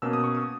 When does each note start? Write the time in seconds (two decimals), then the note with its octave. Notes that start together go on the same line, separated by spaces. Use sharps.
0.02 B2 A#3 C#4 E6
0.13 D#6
0.24 C#6
0.35 D#6